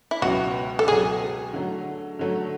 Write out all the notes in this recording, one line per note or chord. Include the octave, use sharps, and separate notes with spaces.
E4
C#2 B2 F#3 F#4
A4
C#2 B2 F#3 G#4
D3 F#3 A3
D3 F#3 A3